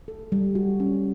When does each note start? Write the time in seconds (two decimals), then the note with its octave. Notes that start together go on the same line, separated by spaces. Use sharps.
0.08 A4
0.32 G3
0.55 F#4
0.80 C#4